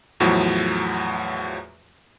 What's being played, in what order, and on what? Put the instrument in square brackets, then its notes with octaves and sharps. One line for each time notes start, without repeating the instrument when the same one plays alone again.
[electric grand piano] E2 A2 F3 F#3